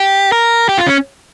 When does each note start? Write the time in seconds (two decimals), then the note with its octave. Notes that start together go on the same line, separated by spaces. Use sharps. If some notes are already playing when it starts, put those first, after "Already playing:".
Already playing: G4
0.32 A#4
0.69 G4
0.78 F4
0.87 C#4